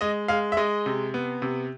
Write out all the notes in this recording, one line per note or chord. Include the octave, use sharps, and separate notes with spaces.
G#3 D#5
G#3 F5
E5
G#3 D#5
C3
B3
C3